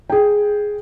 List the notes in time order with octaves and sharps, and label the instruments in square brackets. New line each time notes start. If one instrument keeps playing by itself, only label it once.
[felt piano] G#4 G5